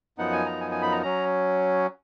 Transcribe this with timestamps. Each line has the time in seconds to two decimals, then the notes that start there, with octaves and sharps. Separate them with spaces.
0.18 F#2 F3 B3 D#4 F#5
0.32 G#5
0.46 A#5
0.60 G#5
0.71 G#5
0.82 B5
0.92 A#5
1.03 F#3 C#4 A#5